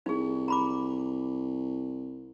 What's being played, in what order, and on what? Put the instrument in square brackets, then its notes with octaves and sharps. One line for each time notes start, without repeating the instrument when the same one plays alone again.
[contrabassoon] C2 [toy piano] D#4 G#4
[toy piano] A#5 B5 D6